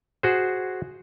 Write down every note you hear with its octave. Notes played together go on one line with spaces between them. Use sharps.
F#4 G#4 C5